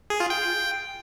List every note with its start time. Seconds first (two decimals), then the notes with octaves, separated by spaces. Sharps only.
0.10 G#4
0.20 F4
0.30 G5